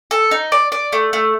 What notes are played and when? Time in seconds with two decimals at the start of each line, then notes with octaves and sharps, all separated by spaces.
0.11 A4
0.31 D#4
0.52 D5
0.72 D5
0.92 A3
1.13 A3